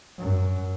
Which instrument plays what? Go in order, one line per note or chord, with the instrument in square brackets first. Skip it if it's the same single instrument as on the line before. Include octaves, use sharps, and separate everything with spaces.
[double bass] F#2